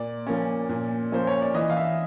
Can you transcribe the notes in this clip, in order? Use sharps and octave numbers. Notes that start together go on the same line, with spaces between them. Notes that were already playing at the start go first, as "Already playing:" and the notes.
Already playing: A#2 D5
F3 A#3 C#4
A#2
F3 A#3 C#4 C5
C#5
D5
E3 D#5
F5
E5